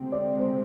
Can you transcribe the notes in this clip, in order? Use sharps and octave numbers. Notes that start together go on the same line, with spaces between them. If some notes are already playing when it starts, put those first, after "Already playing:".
Already playing: D2 C3 G#3 C4
D5
C5